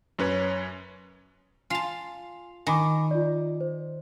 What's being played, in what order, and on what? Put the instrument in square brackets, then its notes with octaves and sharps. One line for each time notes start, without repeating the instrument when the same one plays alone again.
[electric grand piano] F#2 C#4 B4 C#5
[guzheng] F4 A5 [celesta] G#5 C7 F7
[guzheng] D#3 [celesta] G#5 B5 D6
[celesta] F4 D5
C5